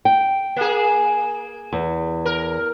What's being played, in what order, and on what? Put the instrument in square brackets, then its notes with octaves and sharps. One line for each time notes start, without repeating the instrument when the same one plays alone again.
[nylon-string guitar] G5
[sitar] A#3 G#4
[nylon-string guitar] E2
[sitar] A#4